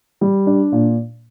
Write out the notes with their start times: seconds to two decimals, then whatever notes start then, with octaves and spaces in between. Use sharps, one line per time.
0.21 G3
0.47 D4
0.72 A#2